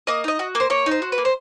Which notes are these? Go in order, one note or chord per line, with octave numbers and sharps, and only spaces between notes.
A#3 D#5
D#4 D#5
F#4
A#3 C5
A#3 C#5
D#4
C5
F#4
B4
A#3
C5